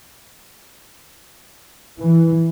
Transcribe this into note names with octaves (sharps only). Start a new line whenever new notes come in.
E3